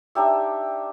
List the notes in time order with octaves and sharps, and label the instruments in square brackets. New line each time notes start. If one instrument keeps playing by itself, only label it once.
[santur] D4 D#4 G4 E5